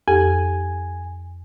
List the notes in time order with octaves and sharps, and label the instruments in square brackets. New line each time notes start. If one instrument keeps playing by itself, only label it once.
[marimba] F2 G4 A4 [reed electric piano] G#5